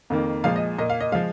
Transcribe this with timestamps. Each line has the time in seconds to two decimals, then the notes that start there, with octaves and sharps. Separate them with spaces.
0.10 F2 D#3 A#3
0.44 A#2 F3 G#3 F5
0.56 D#5
0.78 A#2 A#3 D#5
0.90 F5
1.00 D#5
1.12 F3 G#3 F5